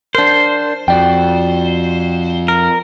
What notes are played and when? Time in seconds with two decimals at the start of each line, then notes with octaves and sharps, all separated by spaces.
0.15 D4 A#4 C5
0.88 F2 F#4 D5 G5
2.48 A#4